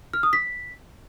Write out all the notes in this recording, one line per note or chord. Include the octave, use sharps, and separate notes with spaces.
F6
D#6
B6